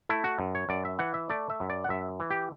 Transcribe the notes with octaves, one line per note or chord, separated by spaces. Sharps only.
A3 E4
F#4
F#2
C#5
F#2 D5
E5
E3 F#5
E5
A3 D5
E5
F#2
D5
F#5
F#2 E5
E3
G4